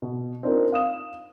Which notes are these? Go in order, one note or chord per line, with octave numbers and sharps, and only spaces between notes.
B2
C4 D4 D#4 F4 A#4
F5 D#6 E7